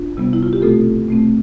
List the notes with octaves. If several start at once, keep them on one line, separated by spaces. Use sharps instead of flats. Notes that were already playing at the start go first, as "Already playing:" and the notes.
Already playing: D4 F4
C3 G3 B3
E4
F4
G4
B2 A3 C4 F4 A4
B2 A3 C4